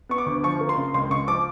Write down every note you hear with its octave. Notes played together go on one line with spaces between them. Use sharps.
B3 C#6
D6
D2
F3 C#6
A#3
C6
C#3
C#2 C6
C#2 C#6
F3 D6